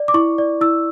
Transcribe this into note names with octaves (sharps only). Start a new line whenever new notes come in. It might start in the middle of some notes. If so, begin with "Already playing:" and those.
Already playing: D5
D6
E4 C#6
D5
E4 E6